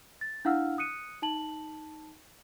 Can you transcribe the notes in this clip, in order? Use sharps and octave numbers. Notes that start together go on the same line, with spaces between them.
A6
D4 E4 F5 F#5 E6 F6
D#6 F#6 C#7 D#7
D#4 A5 F#7